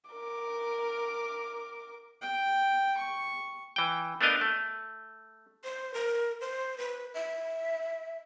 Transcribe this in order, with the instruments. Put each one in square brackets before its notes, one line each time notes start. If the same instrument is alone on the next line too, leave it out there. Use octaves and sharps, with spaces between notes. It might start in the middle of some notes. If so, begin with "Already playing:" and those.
[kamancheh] A#4 D6
[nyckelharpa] G5
C#6
[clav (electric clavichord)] E3 G5
A3 B3 D4 A#4 D#5 F5
A3
[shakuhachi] C5
A#4
C5
B4
E5